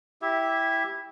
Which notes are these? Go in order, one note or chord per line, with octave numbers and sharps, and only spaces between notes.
E4 G4 E5